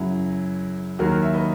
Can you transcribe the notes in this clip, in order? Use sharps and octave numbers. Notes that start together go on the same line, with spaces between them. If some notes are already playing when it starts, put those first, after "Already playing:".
Already playing: F#2 C#3 F#3 E4
D#2 D#3 F#3 F#4 A#4
E5
B4 D#5